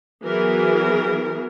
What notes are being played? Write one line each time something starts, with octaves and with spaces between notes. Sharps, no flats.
E3 F#3 B3 G#4 A#4